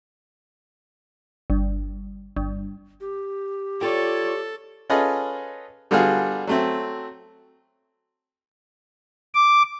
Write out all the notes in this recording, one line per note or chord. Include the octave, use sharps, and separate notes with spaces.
G1
G1
G4
F4 A4 C#5 D5 G5
C#4 F4 G#4 A4 B4 D#5
D3 G3 B3 F4 F#4 G#4
F#3 A3 C4
D6